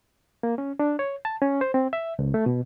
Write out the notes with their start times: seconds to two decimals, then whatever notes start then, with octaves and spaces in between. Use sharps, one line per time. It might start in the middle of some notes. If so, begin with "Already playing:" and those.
0.43 A#3
0.58 C#4
0.79 D4
0.99 C#5
1.25 A5
1.42 C#4
1.61 C5
1.74 C4
1.93 E5
2.19 C#2
2.34 A3
2.46 B2